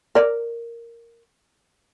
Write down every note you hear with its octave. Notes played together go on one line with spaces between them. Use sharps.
A#4 D5